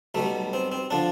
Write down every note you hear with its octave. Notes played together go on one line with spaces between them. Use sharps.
B1 B2 G3 A3
C4
C4
D3 F3 D4